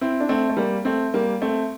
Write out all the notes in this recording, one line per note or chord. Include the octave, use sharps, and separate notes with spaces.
C4 E4
D4
A3 C4
A3
G3 A#3
A3 C4
G3 A#3
A3 C4